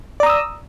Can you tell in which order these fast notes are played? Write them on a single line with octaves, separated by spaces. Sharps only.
D5 A#5 D#6 E6